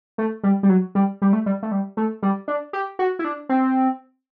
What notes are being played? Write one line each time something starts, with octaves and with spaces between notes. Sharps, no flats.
A3
G3
G3
F#3
G3
G3
A3
G3
A3
G3
A3
G3
D4
G4
F#4
E4
D4
C4